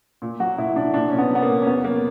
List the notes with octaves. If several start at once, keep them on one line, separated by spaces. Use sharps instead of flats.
A#2
F#3 F#4
A#2 E4
A#2 D4
A#2 D4
A#2 C#4
B3
F#3
B3
A#3
A#2
C#4
E2 B3
F#3 A#3